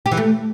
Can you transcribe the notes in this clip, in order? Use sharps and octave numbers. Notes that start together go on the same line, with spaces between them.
G4
E3
A3